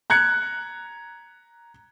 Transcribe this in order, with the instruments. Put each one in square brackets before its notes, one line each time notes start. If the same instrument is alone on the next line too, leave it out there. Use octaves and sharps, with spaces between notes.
[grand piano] A#5 F#6 G#6 C#7